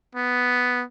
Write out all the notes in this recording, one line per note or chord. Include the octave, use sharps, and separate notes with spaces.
B3